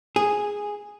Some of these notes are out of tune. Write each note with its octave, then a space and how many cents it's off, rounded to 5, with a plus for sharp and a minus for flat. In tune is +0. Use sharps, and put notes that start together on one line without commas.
G#4 -5